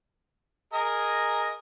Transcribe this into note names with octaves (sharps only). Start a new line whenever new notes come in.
G#4 A#4 D#5